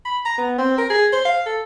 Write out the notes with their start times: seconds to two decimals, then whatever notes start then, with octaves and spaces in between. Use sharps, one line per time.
0.05 B5
0.26 A#5
0.38 B3
0.59 C4
0.78 A#4
0.90 G#4
1.13 C5
1.25 F5
1.46 A4